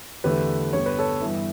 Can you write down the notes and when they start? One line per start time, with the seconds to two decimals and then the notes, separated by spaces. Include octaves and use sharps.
0.24 E2 D3 A3 G4 B4
0.73 G2 D3 G3 B3 C#5
0.86 B4
0.99 A4 C#5
1.21 G2 E3 B3 E4